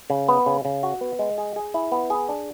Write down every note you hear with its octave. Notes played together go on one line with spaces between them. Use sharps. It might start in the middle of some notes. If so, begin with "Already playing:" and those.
C#3
B3
C#3
C#3
F#4
B3
G#3
G#4
G#4
E4
B3
G#4
D4